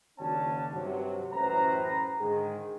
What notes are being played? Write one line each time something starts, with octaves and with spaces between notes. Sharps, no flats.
F#1 D#3 C#4 D4 F#4 A5
G2 C3 F#3
A1 F#2 A2 B4 C5 A#5
G#2 D3 D#3 G#3 G#4